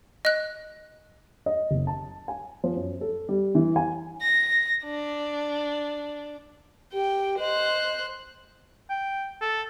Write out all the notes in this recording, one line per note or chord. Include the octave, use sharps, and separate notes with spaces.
D#5 F#6
D#5
F#1
A5
G#5
F3
F#2
A4
G3
E3
G#5
A#6
D4
G4 G5
C5 D#5 F#6
G5
A4